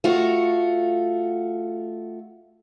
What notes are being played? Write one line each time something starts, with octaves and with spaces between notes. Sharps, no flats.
A3 F4 F#4